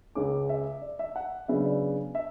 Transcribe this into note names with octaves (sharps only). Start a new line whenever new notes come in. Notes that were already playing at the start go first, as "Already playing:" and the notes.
C#2 C#3 G#3 C#4 D6
E5
D5
E5
F#5
C#3 F#3 B3 D4 E5
D5
E5